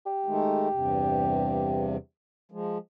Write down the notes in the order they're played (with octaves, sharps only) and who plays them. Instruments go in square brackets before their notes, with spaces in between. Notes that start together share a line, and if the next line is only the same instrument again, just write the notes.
[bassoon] G4
[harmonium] D#3 G#3 A3
E2 G2 C3
F3 G#3